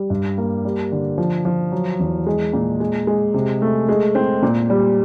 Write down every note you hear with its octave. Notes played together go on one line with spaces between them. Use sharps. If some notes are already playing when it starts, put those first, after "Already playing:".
Already playing: G3
G2
A#3
G3
D3
F3
F3
F#3
E2
G#3
A#2
G#3
G#3
C3
A3
G#3
C4
A#2
G3